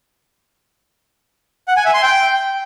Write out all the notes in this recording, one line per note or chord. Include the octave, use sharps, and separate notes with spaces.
F#5
G#5
E5
C6
G5